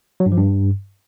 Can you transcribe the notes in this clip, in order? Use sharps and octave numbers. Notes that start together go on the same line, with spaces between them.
F#3
G2
F3
G2